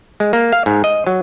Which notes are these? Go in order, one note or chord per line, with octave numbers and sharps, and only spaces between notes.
G#3
A#3
F5
G#2
D#5
F#3